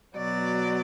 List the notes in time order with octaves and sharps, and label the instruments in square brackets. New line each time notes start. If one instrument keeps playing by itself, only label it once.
[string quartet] B2 F#3 D5